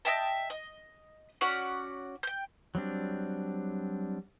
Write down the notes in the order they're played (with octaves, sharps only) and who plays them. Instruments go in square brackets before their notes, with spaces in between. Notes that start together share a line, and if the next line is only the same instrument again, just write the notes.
[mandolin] D#5 E5 G5 A5
D#5
C#4 F#4 D5 F#5
G5 G6
[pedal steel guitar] F#3 G3 C4 D4